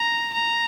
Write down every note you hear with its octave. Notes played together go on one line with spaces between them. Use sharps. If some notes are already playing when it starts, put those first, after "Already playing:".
Already playing: A#5
A#5